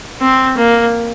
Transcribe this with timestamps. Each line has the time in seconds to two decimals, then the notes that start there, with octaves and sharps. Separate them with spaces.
0.21 C4
0.57 A#3